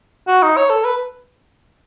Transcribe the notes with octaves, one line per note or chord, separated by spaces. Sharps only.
F#4
D#4
C#5
A4
B4